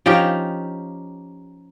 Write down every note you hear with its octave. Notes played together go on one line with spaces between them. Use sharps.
F3 C#4 D#4 G4